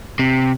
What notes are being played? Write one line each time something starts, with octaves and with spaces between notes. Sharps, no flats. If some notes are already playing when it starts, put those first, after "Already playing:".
C3